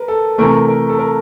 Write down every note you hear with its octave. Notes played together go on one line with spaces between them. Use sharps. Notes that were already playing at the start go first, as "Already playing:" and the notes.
Already playing: A#4 B4
A4
C3 E3 A3 A#4
A#4
A4
A#4